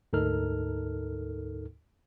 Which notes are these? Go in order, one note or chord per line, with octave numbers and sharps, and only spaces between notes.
D2 G#2 D#4 A4 A#4 F6